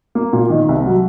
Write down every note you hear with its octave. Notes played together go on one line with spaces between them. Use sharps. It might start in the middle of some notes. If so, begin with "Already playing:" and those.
A#3
A#2
D#3
C2
F#3